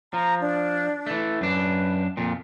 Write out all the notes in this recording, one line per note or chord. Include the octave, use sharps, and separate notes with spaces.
F3 A#5
D4
E3 A3
F#2 D4 B4
F2 A#2